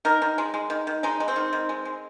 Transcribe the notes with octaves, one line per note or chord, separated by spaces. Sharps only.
D#3 A#4
D#3
G#3
G#3
D#3
D#3
G#3 D#4
G#3
C4
D#3
D#3
G#3
G#3